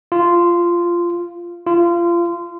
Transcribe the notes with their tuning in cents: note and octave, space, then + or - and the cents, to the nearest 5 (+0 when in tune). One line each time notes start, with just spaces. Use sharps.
F4 -10
F4 -25